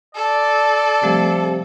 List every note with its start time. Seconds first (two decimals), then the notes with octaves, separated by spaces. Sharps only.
0.15 A4 D5
1.03 C3 F3 G3 A3